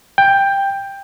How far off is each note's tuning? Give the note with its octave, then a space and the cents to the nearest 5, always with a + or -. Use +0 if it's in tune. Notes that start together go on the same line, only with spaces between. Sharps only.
G5 +10